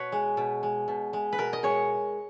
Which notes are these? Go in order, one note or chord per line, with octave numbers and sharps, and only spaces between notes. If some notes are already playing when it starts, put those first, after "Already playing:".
Already playing: B2 B4 C#5
G#3
B2
G#3
B2
G#3
B4
B2 A#4
D#5
G#3 C#5